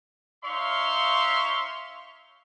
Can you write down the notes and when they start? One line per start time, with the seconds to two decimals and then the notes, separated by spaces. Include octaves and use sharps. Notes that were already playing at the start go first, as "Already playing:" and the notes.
0.44 D#4 C#5 E5 F5 C6 C#6